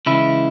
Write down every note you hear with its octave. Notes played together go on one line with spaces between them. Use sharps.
C#3 E3 G#3 E4